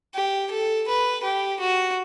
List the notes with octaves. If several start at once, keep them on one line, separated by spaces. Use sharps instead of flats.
G4
A4
B4
G4
F#4